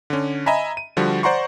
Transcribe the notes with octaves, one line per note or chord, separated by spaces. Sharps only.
D3 C#4
D#5 E5 G#5 A#5 B5
D#7
D3 F3 G3 F#4
C5 D5 F#5 A#5 C6 C#6